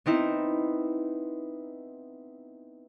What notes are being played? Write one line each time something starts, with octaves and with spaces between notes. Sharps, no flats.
B3 C4 D#4 E4